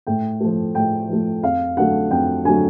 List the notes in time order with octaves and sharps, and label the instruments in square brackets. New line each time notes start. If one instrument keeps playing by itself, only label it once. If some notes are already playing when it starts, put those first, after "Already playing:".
[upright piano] A2 G5
F3 A3
A2 G5
F3 A3
F2 F5
D3 F#3 A3 F#5
F2 G5
D3 F#3 A3 G#5